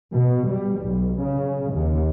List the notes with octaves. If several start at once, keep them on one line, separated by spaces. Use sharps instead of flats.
B2
G3
B1
C#3
D#2